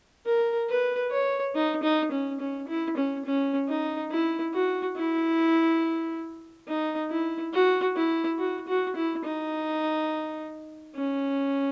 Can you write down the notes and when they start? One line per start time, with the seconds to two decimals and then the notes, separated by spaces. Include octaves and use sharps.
0.26 A#4
0.69 B4
1.12 C#5
1.55 D#4
1.83 D#4
2.12 C#4
2.40 C#4
2.68 E4
2.97 C#4
3.25 C#4
3.69 D#4
4.11 E4
4.54 F#4
4.97 E4
6.68 D#4
7.10 E4
7.53 F#4
7.96 E4
8.39 F#4
8.67 F#4
8.96 E4
9.25 D#4
10.96 C#4